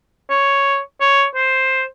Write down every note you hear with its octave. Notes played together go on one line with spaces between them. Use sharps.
C#5
C#5
C5